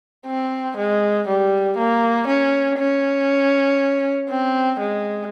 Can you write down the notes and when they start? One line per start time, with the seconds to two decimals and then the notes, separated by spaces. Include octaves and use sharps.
0.27 C4
0.77 G#3
1.27 G3
1.78 A#3
2.27 C#4
2.79 C#4
4.29 C4
4.80 G#3